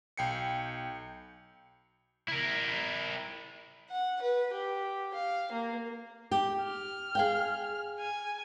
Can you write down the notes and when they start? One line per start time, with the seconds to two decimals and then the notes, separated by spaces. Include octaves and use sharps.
0.17 B1 G5 C7 C#7
2.28 E4 A#4
3.90 F#5
4.21 B4
4.53 G4
5.14 F5
5.52 A#3
6.31 G4
6.64 F6
7.15 G#4 F5 G5
7.99 G#5